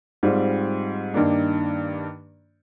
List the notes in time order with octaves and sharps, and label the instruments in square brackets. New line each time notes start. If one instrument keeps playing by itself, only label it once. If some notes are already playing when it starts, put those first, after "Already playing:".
[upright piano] G#2 G3 C4 F4
G2 D#3 A#3 D4